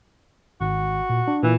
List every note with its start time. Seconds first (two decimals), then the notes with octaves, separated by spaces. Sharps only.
0.61 G#1 F#4
1.10 A#2
1.28 D4
1.43 A#2 E3